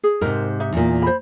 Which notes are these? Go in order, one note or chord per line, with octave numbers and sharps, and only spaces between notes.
G#4
G#2 C3 A#4
D#4 E5
E2 A#2
C5 B5